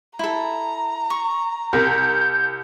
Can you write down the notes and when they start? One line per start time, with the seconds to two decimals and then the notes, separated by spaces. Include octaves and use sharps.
0.19 E4 A4 A#5
1.10 C#6
1.73 C2 A#4 G6